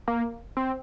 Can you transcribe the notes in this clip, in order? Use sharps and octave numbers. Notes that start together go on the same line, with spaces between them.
A#3
C4